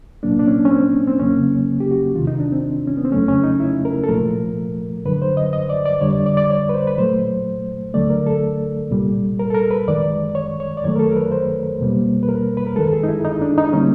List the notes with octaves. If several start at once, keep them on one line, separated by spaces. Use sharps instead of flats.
C2 A#2 F#3 A#3 D4
D4
C#4
C#4
C4
C4
F2 C#3 F#3 A#3 C#4
G4
F#4
E2 C3 D#3 F4
D#4
D4
C4
C#4
B3
C4
F2 C#3 F#3 A3 C#4
C#4
D#4
E4
A#4
A4
C2 A#2 F3 A3 A#4
F#2 D3 F#3 B4
C5
D#5
D#5
D5
D5
F2 D3 G3 C#5
D5
D5
D5
C#5
B4
C5
B4
A#2 F#3 A3 C5
D2 D3 F#3 A3 D5
A#4
A4
C2 A#2 G3
A#4
A4
A#4
B4
F#2 D#3 G#3 D5
C#5
C#5
D5
F#2 D#3 F#3 A3 C#5
A#4
A4
A#4
B4
C5
E2 B2 G3 A#3
B4
A#4
B4
A#4
F#2 D#3 G#3 A4
A4
G#4
D#4
E4
D#4
D4
D#4
D3 G3 A#3 C#4